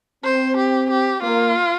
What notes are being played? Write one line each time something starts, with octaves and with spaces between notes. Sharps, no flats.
C4 C5
G4
G4
A#3 F4